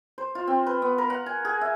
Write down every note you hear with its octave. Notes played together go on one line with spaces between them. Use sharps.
C5
F4
C4
B4
B3
A#4
F#5
G#5
G#4
E5